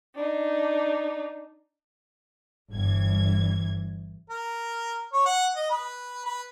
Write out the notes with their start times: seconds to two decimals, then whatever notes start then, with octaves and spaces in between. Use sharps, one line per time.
0.14 D4 D#4
2.71 G1 G2 E3 G#6
4.30 A#4
5.13 C#5
5.26 F#5
5.56 D#5
5.70 B4
6.25 B4